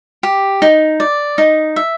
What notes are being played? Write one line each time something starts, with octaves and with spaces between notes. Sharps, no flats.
G4
D#4
D5
D#4
E5